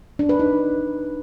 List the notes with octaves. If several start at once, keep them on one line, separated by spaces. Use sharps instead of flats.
D4
B4
D#4